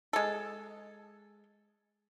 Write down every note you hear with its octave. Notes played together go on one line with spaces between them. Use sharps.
G#3 A4